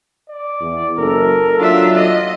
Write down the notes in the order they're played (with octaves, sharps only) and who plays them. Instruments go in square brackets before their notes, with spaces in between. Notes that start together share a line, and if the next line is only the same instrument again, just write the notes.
[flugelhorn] D5
[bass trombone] E2
[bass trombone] F#1 [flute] A4 [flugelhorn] A#4
[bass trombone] F#3 [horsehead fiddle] D4 E5 [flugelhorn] F4
[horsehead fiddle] D#5